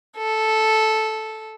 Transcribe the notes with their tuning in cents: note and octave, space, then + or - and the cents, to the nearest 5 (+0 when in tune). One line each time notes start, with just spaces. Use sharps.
A4 -5